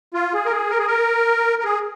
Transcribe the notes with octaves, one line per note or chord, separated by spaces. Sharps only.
F4
G#4
A#4
G#4
A#4
G#4
A#4
A#4
G#4